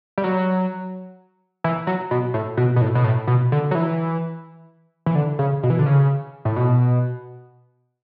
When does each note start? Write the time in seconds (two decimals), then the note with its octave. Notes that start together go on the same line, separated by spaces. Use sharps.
0.18 G3
0.24 F#3
1.64 E3
1.87 F#3
2.11 B2
2.34 A2
2.57 B2
2.76 B2
2.81 A2
2.95 B2
3.04 A2
3.27 B2
3.52 D3
3.71 F#3
3.75 E3
5.06 E3
5.15 D3
5.39 C#3
5.63 B2
5.70 E3
5.79 D3
5.86 C#3
6.45 A2
6.56 B2